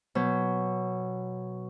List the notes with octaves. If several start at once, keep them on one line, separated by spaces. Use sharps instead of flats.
B2 F#3